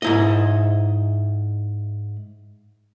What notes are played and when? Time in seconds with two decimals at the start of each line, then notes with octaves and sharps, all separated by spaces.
0.02 G#2 E4 D#5